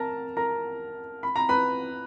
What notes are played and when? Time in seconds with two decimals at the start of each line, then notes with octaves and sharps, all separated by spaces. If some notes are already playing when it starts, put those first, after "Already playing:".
Already playing: A#4 A5 A#5
0.37 A#4 A#5
1.23 B5
1.36 A#5
1.49 B4 B5